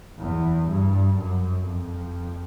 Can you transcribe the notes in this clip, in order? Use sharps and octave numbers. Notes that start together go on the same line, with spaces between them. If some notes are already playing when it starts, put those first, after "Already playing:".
E2
G2
F#2
F2